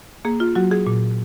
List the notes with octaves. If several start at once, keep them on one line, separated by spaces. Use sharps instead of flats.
A#3 G#4
F4
F#3 F#4
G#4
A#2